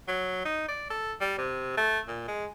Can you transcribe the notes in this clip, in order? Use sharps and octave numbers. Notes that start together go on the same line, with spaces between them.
F#3
D#4
D5
A4
G3
C3
A3
A#2
G#3